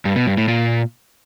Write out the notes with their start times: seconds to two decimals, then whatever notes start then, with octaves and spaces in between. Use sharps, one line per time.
0.05 G2
0.16 B2
0.27 G2
0.37 A2
0.48 A#2